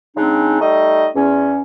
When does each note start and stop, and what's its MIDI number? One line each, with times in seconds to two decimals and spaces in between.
0.16 0.58 49
0.16 0.58 56
0.16 0.58 60
0.16 0.58 62
0.16 0.58 63
0.60 1.07 55
0.60 1.07 57
0.60 1.07 63
0.60 1.07 75
1.15 1.62 40
1.15 1.62 61